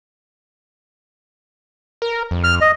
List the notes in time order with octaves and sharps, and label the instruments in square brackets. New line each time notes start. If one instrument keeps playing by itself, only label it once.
[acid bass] A#4
F2
[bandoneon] F6
D#5